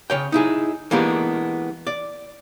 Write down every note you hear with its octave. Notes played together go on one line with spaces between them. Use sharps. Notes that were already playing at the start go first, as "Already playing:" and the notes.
C#3 C#5 G5
D#4 E4 G#4
E3 G#3 A#3 B3 D4 G4
D5